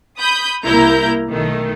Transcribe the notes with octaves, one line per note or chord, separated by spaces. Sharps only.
B5 D#6 G6
C2 A#3 E4 A#5 G6
B1 D#3 A3